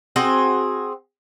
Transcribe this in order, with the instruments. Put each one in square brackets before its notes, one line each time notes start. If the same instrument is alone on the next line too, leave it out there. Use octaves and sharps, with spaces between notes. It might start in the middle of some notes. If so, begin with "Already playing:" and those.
[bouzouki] C4 F#4 G#4 G5